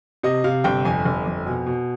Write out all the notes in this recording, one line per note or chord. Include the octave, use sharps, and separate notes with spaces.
C3 D#5
C3 F5
G1 G5
F2 G#5
G1
F2
B2 G#5
B2